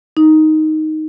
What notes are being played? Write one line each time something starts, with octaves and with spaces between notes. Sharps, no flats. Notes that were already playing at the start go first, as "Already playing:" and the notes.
D#4